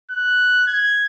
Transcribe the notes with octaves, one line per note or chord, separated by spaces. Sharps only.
F#6
G#6